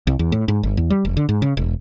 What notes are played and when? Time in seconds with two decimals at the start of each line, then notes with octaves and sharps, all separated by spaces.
0.07 C2
0.19 E2
0.32 A2
0.48 G#2
0.63 G1
0.77 E2
0.90 G3
1.05 F1
1.17 D3
1.29 G#2
1.42 C#3
1.57 E1